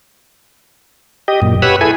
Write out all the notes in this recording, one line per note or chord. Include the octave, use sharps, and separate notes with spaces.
G4 D#5
F#2 A#2
G4 B4 C#5 F#5 B5 E6
E4 G#4 A4 G#5 B5